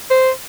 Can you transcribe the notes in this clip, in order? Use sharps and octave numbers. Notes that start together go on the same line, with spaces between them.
C5